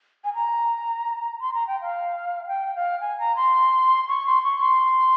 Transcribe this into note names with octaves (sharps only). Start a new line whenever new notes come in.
G#5
A#5
C6
A#5
G5
F5
G5
F5
G#5
A#5
C6
C#6
C6
C#6
C6